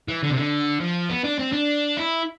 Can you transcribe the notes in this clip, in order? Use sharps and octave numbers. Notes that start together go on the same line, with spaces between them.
E3
D3
C3
D3
F3
B3
D4
C4
D4
E4